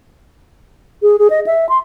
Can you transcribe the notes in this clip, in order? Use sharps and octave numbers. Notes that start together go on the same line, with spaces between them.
G#4
G#4
D#5
E5
C6